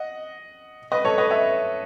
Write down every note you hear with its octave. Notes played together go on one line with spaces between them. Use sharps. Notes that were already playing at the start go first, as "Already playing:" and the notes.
Already playing: D#5 F#5
B4 D#5
A4 C#5
B4 D#5
C#5 E5